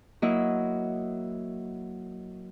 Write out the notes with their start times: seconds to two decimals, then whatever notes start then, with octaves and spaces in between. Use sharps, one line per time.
0.22 F#3 A#3 E4 D#5